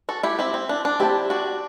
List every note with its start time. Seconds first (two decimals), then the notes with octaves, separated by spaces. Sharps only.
0.09 F#4 A4
0.23 E4 G4
0.39 C4 E4
0.54 C4
0.69 D4
0.85 D4
1.00 C4 E4 G4 D5 A5
1.30 D4 F#4